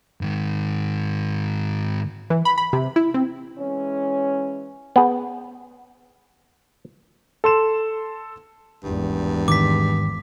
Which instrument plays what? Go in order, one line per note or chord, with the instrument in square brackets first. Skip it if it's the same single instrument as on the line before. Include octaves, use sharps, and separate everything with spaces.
[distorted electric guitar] G#2 D#3
[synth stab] E3
B5
B5
C3
E4
C4
[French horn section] E3 G#3 C#4
[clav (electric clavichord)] B3 G#4
[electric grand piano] A4 C6 E7
[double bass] G#1 E2 [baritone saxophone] G2
[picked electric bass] G#2 D#3 [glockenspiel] D6 B6